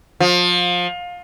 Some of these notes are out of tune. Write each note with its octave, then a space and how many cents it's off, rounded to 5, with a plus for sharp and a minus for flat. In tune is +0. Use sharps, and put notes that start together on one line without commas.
F3 +25